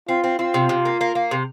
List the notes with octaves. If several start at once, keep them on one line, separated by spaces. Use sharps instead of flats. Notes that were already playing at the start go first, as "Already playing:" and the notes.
C4 F4
C4
C4 F4
C3
C3
A#3
A#3
A#3
C3